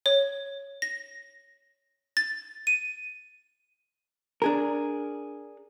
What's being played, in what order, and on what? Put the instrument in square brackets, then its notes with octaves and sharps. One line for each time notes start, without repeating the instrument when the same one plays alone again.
[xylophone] C#5
A#6
A6
D#7
[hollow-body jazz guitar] D4 G#4 A#4